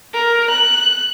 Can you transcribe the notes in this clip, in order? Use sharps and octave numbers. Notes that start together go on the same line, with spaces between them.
A#4
F#6